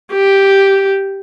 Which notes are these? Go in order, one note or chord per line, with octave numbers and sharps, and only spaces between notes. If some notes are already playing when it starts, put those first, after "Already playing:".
G4